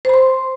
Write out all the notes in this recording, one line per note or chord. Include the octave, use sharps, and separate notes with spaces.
C5 B5 C6